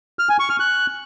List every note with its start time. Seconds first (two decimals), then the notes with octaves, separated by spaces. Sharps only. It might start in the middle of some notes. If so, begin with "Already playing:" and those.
0.19 F6
0.29 G#5
0.39 C#6
0.50 F6
0.60 F#6